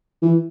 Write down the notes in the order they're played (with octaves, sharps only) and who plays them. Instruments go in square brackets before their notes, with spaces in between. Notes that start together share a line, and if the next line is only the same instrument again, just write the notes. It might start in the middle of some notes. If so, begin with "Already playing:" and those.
[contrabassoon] E3